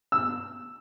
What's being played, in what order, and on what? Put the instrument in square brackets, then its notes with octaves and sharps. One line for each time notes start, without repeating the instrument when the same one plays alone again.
[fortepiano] E6